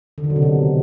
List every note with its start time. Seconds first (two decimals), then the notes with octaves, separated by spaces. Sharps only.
0.18 D3
0.24 D#3
0.30 F#3
0.36 C3
0.42 B2